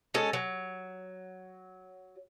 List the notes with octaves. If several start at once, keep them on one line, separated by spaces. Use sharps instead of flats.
G#3 C#4 A4
F#3